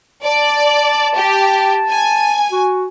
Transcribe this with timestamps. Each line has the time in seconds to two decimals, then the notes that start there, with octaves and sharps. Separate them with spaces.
0.23 D5 A5
1.15 G4
1.88 G#5
2.52 F#4